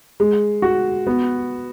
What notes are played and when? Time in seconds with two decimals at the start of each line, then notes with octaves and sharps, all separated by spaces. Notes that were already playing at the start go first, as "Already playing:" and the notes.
0.20 G#3
0.62 F#4
1.07 B3